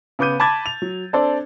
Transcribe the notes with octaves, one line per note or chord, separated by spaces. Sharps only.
C#3 B3 D6 G6 D#7
A5 B5 D6 G#6 A6
F7
F#3
C4 D4 A4 C5 D5